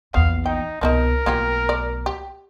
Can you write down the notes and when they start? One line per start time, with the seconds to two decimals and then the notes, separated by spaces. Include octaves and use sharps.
0.14 A#1 E2 B3 F5
0.46 D#4 G5
0.81 C2 B2 F3 C#4 D#4 A#4
1.26 B1 A3 A#3 F4 G4
1.69 D5
2.06 G4